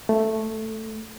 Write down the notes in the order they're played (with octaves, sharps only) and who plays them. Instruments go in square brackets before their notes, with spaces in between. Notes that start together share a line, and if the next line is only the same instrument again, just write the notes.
[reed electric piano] A3